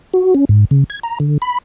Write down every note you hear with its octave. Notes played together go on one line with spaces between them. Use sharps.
F#4
C#4
G#2
C#3
G#6
A#5
D3
B5